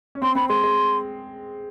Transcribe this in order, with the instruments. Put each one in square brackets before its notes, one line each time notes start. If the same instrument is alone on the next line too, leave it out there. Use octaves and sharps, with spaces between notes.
[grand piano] C#4
[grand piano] C4 [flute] C6
[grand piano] C4 [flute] B5
[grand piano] G#3 [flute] C6
[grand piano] G#3